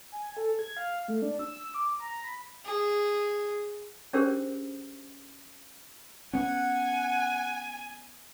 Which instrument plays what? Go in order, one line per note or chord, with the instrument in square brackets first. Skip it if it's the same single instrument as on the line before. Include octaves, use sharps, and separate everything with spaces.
[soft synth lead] G#5
A4
G#6
F5
A3
D4
E6
D6
A#5
B5
[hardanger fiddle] G#4
[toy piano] C#4 D4 G4 G#4 A#4 C5
[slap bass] B3 C#4 [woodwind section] F#5 [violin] G#5